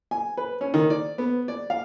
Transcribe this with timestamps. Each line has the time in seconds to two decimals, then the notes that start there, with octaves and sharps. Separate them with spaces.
0.11 G#5
0.37 B4
0.61 C#4
0.74 D#3
0.90 D5
1.18 B3
1.48 D5
1.70 F5